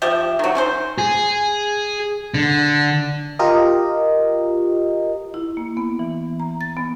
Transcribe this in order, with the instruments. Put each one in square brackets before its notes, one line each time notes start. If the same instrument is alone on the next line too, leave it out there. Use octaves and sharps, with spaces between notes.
[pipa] F3 G4 E5
D#3 F#3
C#4 E4 C5
[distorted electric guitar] G#4
D3
[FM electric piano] F4 G4 A#4 D#5
[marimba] E4
A#3
B3
E3
A#5
A6
B3